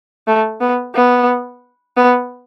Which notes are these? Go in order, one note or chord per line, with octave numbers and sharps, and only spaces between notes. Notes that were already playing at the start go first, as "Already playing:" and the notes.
A3
B3
B3
B3